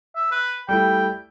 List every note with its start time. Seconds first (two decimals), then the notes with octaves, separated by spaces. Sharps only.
0.15 E5
0.32 B4
0.69 G3 A3 E4 G5